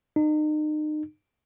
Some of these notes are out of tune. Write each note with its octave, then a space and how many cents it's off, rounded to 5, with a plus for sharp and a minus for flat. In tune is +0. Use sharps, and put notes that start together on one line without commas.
D#4 -35